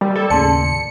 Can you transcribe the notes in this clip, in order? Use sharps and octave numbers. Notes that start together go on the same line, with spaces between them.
G3 A#4
A4 D5 D6
D#2 A2 C#3 D5 A5 C6 C#7